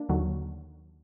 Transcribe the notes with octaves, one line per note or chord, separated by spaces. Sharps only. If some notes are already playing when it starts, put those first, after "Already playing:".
Already playing: A#3 D4
D#2 D3 F#3